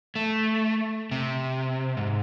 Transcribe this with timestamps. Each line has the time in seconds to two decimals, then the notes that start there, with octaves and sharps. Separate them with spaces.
0.16 A3
1.11 C3
1.97 G#2